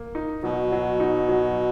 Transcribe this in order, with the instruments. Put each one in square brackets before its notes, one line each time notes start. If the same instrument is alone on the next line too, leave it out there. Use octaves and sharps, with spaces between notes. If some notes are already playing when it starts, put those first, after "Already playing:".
Already playing: [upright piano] A#3
D#4
[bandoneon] B2 [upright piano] F#3
[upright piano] F#3
D#4
F#3